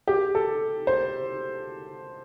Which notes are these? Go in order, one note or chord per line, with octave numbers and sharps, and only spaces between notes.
G4
A4
C5